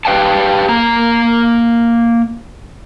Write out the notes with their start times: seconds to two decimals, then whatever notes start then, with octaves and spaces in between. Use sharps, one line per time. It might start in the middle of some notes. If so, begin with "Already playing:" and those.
0.05 G4 B4 F5 G5 A5
0.69 A#3 A#5